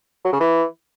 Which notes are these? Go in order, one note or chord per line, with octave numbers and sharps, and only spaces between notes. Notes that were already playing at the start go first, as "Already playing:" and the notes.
F#3
C#3
E3